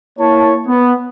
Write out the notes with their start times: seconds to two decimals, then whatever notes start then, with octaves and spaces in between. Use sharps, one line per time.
0.18 A#3 E4 C#5 A5
0.67 B3